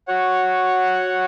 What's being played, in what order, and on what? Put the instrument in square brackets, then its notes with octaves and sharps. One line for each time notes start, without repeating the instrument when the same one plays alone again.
[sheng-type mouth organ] F#4 C#5 F#5